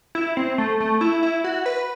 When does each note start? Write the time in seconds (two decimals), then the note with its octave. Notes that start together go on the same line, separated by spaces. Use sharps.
0.15 E4
0.37 C4
0.58 A3
0.80 A3
1.01 E4
1.23 E4
1.44 F#4
1.66 B4